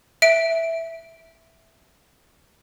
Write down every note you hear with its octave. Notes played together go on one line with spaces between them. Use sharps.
E5 D7